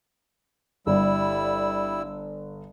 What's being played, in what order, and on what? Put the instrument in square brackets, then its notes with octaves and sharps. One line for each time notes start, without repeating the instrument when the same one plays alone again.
[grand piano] G1 [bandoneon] G3 E4 E6